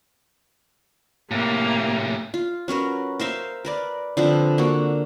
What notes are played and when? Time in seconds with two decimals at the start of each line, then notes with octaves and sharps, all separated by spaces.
1.31 A2 C3 A#3
2.34 F4
2.68 F#3 C#4 A#4 B4
3.20 A#4 C5 E5 F5
3.65 A#4 B4 D5
4.17 D3 F3 C4 B4
4.58 A#3 F#4 A4